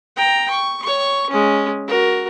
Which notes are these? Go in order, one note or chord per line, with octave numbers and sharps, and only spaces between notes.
G5 A#5
C#6
C#5 C#6
G#3 C#4
F#4 A#4